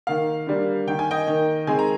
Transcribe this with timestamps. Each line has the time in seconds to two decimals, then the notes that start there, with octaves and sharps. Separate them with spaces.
0.07 D#3 A#3 F5
0.47 D3 G3 A#3
0.87 D#3 A#3 G5
0.99 G#5
1.11 D#5 G5
1.27 D#3 A#3
1.67 D#3 G#3 C4 G#5
1.79 A#5